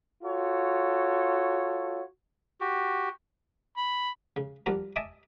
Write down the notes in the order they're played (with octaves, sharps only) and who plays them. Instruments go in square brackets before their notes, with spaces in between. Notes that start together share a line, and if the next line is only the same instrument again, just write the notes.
[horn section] F4 F#4 A4 C#5
[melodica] F#4 G4
[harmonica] B5
[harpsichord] C#3
F3 G3 A#3 D4 F#4
D#5 E5 G#5 A5 D6